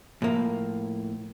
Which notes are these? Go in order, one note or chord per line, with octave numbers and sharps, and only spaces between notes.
A2 F3 A#3